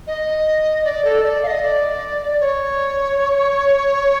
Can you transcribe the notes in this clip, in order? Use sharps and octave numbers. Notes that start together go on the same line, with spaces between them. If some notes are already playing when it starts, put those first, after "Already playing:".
D#5
D5
A4
D5
F5
D#5
D5
C#5